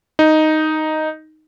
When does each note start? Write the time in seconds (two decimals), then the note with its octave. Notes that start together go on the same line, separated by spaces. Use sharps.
0.19 D#4